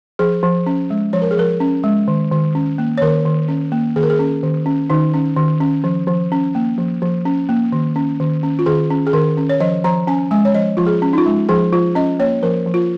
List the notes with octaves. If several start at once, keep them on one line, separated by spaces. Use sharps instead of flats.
F3 G#4
F3
C#4
G#3
F3 C#5
A#4
G#4
F3 A#4
C#4
G#3
D#3
D#3
C#4
A#3
C#5
D#3 A#4
D#3
C#4
A#3
D#3 G#4
A#4
G#4
C#4
D#3
C#4
D#3 D#4
C#4
D#3
C#4
F3
F3
C#4
A#3
F3
F3
C#4
A#3
D#3
C#4
D#3
C#4
F4
D#3 G#4
C#4
G#4
D#3 A#4
C#4
C#5
F3 D#5
F3 A#5
C#4 G#5
G#3 G#5
C#5
F3 D#5
F3 F4
G#4
C#4
D#4
F4
G#3
F3 G#4
F3 F4
C#4 D#5
A#3 C#5
F3 A#4
F3
F4